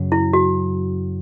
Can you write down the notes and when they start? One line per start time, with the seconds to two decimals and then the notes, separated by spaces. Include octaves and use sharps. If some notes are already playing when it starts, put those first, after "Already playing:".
Already playing: F#2 C#3 F#3
0.12 E4
0.33 F#4